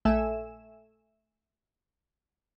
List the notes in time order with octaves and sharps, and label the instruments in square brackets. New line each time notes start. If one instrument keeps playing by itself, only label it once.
[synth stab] A#1 A3 A4 E5 G#5 E7